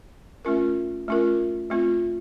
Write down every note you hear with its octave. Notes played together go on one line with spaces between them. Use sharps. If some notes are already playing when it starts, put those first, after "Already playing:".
A3 C#4 F4 A#4
A3 C#4 F4 A#4
A3 C4 F4